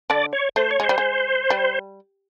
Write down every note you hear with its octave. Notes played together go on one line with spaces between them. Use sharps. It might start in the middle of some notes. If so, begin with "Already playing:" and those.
D3 D4 D5
C#5
A3 C5
C#5
G#3
C5
G3
G#3
G3